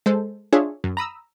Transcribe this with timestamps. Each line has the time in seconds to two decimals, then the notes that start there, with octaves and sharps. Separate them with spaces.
0.06 G#3 A4 C5
0.53 D4 F4 G#4 C#5 E5
0.84 F#2
0.97 A#5 B5 D#6 E6